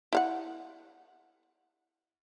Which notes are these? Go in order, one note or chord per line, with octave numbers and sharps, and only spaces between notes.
E4 F5 F#5